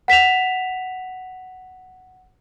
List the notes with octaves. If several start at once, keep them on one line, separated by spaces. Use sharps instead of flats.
F#5 B6 E7 F7